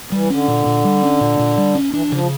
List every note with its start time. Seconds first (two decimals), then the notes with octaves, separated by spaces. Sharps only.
0.12 E3 G3
0.30 D3 C#4
0.48 A#2
0.66 A#2
0.84 G3
1.03 C#4
1.21 A#2
1.39 A#2
1.57 G3
1.75 C#4
1.93 E3 D4
2.06 E3
2.11 C#3 F3